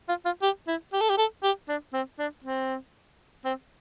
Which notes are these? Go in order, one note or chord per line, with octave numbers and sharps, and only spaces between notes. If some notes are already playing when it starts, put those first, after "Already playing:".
F4
F4
G4
E4
G4
A4
G4
A4
G4
D4
C4
D4
C4
C4